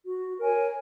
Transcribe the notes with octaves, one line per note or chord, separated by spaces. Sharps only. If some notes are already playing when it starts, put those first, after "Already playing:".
F#4
A#4 C#5 G#5